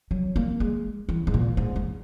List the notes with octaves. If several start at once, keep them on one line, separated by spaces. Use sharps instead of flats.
F#3
A#3
G#3
E3
G#2
A#2
G#2
E2